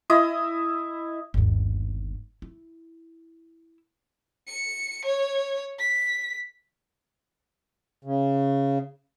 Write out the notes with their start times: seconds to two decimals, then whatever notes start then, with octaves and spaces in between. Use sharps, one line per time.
0.10 E4 D#5 D#6
1.34 G1 D#2
2.42 E4
4.47 C#7
5.05 C#5
5.79 B6
8.04 C#3